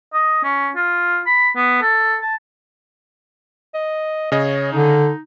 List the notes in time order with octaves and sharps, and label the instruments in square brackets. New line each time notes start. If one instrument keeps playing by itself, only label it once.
[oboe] D#5
C#4
F4
B5
B3
A4
A5
[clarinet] D#5
[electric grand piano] C#3 D#5 [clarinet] C#5
[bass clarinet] D3 [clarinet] D#4